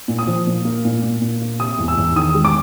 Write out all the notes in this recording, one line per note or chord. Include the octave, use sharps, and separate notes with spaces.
A#2
D#6
F3
A#2
A#3
A#2
A#2
A#2
A#3
C3 D#6
E2
E6
E2
D#3 D#6
G#3
D6